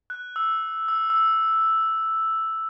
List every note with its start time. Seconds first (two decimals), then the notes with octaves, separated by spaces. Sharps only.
0.10 F#6
0.36 E6
0.88 E6
1.10 E6